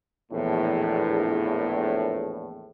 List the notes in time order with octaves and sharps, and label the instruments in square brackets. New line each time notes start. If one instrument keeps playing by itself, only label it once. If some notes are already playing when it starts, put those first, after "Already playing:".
[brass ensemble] A#1 E2 A2